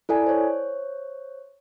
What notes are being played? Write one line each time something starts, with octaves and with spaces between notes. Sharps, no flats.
E4 A4 D5 G#5
C5 C#5